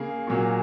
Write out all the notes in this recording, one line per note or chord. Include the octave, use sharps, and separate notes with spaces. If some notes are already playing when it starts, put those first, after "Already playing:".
Already playing: C#3 A#3 G#4
A#2 F#3 A#3